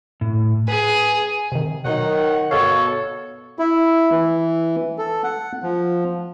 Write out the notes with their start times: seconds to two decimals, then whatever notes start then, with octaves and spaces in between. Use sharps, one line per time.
0.21 A2
0.68 G#4 B4
1.52 C3 D#3
1.85 B2 D#3 F#3 D#4 C#5 F#5
2.51 G1 B2 F#4 A4 C#5 F5
3.59 E4
4.12 E3
4.98 A4
5.24 F#5
5.63 F3